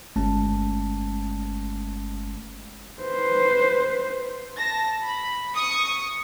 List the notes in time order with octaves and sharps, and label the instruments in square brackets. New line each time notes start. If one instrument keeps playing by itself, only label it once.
[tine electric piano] G1 G#3 A3 C#4 A5
[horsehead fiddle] B4 C5
[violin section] A5 A#6
B5
C#6 D#6